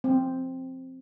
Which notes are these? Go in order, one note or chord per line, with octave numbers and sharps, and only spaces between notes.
C4